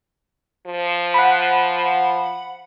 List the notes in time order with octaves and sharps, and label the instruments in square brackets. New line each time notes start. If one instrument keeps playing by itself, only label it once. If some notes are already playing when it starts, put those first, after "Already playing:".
[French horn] F3
[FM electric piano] F#5 B5